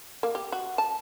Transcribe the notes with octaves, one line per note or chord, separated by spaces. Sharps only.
A#3
G4
F#4
A5